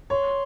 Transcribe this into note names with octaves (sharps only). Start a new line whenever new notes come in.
C#5 C6